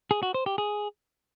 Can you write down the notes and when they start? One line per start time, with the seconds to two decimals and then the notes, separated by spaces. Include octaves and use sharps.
0.11 G#4
0.23 F#4
0.34 C5
0.46 G4
0.58 G#4